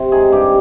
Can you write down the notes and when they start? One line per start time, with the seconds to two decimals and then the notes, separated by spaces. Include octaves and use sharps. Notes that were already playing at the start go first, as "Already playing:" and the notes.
Already playing: C3 C4 C5
0.12 D#3 G#3 G#4
0.32 G2 G4